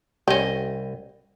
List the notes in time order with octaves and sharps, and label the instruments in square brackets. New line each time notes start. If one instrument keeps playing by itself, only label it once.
[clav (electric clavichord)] C2 D#5 [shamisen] C#4 G4